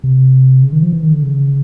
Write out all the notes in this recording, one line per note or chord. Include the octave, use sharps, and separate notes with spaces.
C3
C#3
D#3
F3
E3
D#3
D3
C#3